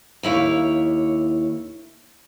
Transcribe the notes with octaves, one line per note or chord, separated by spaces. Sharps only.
D#2 E4 C#5 F5